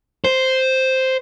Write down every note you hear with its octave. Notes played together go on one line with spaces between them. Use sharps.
C5